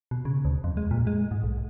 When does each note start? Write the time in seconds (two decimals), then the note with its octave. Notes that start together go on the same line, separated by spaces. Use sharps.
0.11 B2
0.25 C#3
0.45 D2
0.64 F2
0.77 G#3
0.91 A#2
1.07 G#3
1.31 G#2
1.43 B1